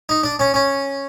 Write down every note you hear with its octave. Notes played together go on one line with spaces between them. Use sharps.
D#4
D4
C#4
C#4